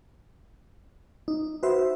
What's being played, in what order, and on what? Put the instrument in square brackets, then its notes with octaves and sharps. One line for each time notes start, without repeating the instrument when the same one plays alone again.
[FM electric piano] D#4
F#4 B4 C5 E5